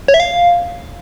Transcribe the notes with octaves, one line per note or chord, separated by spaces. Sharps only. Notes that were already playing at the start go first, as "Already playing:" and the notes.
C#5
E5
F5